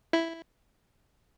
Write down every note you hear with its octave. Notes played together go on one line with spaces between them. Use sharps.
E4